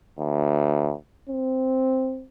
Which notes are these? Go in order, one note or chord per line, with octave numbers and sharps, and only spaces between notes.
D2
C4